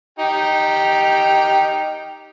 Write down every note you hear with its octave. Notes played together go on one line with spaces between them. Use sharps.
D#4 G4 G5